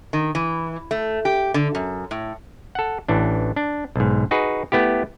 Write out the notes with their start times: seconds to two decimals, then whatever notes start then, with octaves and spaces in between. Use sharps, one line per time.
0.13 D#3
0.35 E3
0.91 A3
1.25 G4
1.54 D3
1.75 F#2
2.11 A2
2.75 A4 F#5
3.08 A1 E3 D4
3.56 D4
3.96 B1 G#2
4.31 D#4 F#4 G#4 B4
4.72 A3 B3 E4 G4